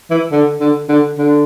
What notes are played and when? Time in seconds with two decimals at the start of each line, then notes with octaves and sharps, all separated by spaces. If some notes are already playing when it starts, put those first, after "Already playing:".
0.11 E3
0.32 D3
0.60 D3
0.89 D3
1.18 D3